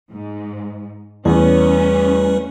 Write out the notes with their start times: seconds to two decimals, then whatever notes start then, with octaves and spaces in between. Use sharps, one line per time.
0.11 G#2
1.25 E2 G3 A3 C#4 B4